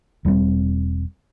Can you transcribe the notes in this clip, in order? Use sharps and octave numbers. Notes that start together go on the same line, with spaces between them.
E1 G3 A#3 C4